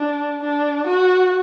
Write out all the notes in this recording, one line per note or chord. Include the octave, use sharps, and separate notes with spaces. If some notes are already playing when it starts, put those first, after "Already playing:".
Already playing: D4
D4
F#4